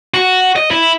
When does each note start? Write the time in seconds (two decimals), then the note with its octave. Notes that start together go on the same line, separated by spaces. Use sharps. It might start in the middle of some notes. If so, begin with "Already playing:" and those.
0.14 F#4
0.56 D#5
0.71 E4